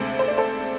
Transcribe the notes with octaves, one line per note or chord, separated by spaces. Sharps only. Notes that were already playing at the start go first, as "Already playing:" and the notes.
Already playing: D2 C3 G#3 A4 C5
C5
D5
A4 C5